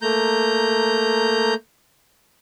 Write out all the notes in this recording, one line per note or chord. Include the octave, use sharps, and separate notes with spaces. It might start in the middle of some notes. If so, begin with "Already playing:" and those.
A3 A#3 A#5 G6